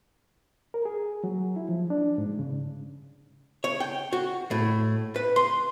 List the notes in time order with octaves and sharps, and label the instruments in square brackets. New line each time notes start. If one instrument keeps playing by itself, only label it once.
[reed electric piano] A#4
G#4
F#3
E4
F3
D4
G#2
C#3
[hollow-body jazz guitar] C#5
G5
F#4
A2
B4
C6